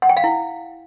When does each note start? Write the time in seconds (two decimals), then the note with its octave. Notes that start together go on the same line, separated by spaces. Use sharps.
0.02 F#5
0.09 G5
0.17 F5
0.24 E4